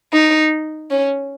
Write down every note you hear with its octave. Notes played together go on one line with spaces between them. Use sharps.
D#4
C#4